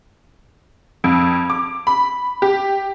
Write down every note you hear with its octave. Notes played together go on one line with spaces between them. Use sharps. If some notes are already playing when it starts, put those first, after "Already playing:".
F2
D6
B5
G4